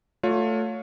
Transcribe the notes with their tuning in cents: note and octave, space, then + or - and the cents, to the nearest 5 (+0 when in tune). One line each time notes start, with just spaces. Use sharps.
A3 +15 F4 +30 C#5 +15